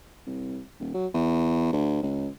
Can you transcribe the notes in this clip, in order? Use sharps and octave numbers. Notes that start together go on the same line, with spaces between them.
C2
D#1
F#3
E2
D2
C#2